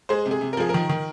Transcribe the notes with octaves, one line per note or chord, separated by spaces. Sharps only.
G#3 G#4 C5
C3
G#4
C3
A#4
F3 G#4
A#4
D#3
D#3